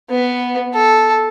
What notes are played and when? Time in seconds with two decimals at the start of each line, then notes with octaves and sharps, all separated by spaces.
0.10 B3
0.74 A4